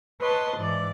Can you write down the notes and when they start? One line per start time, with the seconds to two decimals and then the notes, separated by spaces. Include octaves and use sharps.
0.21 B4 C#5 D#5 A5 C6
0.58 G#2 E3 D5